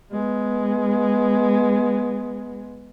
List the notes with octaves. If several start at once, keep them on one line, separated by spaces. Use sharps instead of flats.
G#3 B3